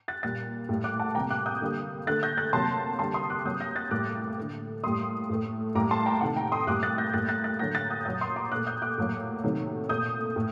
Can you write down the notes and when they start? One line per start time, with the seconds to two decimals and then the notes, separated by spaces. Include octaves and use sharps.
0.08 F#6 A6
0.23 A#2 G3 A#3 F#6 A6
0.69 A2 G3 A#3
0.84 D6 F#6
1.00 F#5 A5
1.15 C3 G3 A#3 G5 A#5
1.30 D6 F#6
1.46 D#6 G6
1.61 D3 G3 A#3
2.07 D3 A3 F#6 A6
2.23 G6 A#6
2.37 F#6 A6
2.53 C3 F#3 A#3 A5 C6
2.99 D3 G3 A#3 A5 C6
3.14 C6 D#6
3.30 D6 F#6
3.45 C3 F#3 A#3 D#6 G6
3.60 G6 A#6
3.75 F#6 A6
3.91 A2 G3 A#3 D6 F#6
4.38 D3 A3
4.83 A2 G3 A#3 C6 D#6
5.29 A2 A3
5.75 A2 G3 A#3 A#5 D6
5.91 A5 C6
6.06 G5 A#5
6.21 C3 D#3 A3 F#5 A5
6.36 G5 A#5
6.52 C6 D#6
6.67 A2 G3 A#3 D6 F#6
6.83 F#6 A6
6.98 G6 A#6
7.13 A2 G3 A#3 F#6 A6
7.29 F#6 A6
7.44 F#6 A6
7.59 D3 F#3 A#3 G6 A#6
7.75 F#6 A6
7.90 D#6 G6
8.05 A#2 F#3 A#3 D#6 G6
8.21 C6 D#6
8.36 A#5 D6
8.52 A#2 A3 D6 F#6
8.67 D#6 G6
8.82 D6 F#6
8.98 A2 F#3 A#3
9.44 C3 D#3 F#3 A3
9.89 A#2 A3 D#6 G6
10.36 A2